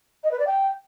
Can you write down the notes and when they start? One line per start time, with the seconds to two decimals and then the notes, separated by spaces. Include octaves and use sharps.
0.24 D#5
0.31 B4
0.39 D5
0.47 G5